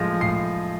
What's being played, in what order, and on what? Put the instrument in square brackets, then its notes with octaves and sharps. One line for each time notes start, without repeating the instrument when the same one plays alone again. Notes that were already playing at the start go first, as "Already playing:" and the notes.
Already playing: [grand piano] A2 F3 G#3 A#6
A2 C7